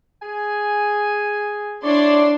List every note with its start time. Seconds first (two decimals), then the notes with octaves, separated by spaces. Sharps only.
0.22 G#4 G#5
1.84 D4 E4 C#5 D5 C6